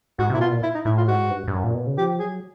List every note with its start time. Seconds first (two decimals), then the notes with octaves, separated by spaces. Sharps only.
0.19 G#2 F#4
0.30 C3
0.34 A#2 E4
0.41 B2 F4
0.52 A#2
0.63 E4
0.75 D#4
0.85 A2 E4
0.97 F4
1.08 G#2 F#4
1.30 G2
1.48 G2
1.52 F#2
1.64 A#2
1.74 B2
1.87 C#3
1.98 F3 G4
2.20 F#3 G#4